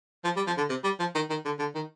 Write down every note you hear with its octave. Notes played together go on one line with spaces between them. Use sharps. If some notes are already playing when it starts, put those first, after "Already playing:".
F3
G3
F3
D3
C3
G3
F3
D#3
D#3
D3
D3
D#3